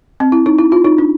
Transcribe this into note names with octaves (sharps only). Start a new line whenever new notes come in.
C4
E4
D#4
E4
F4
D#4
D4